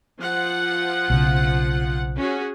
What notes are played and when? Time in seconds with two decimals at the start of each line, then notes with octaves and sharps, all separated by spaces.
0.19 F3 F#5
1.10 B1 C#3
2.16 C#4 F#4 G#4